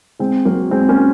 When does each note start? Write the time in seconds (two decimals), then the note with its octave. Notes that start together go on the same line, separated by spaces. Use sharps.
0.19 G#3 C4
0.45 F#3 A#3
0.71 G#3 C4
0.89 A#3 C#4